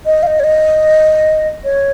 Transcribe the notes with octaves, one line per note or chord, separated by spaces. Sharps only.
D#5
F5
D#5
C#5
D#5
C#5